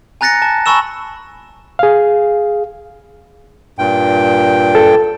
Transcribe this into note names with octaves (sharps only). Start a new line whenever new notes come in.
G#5 A#5 F#6 A6 A#6 C#7
A5
G#5 A5 B5 C#6 E6 E7
G#4 F5
G2 A#2 G5
A4